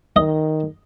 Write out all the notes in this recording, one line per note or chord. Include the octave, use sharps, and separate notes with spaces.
D#3 D#5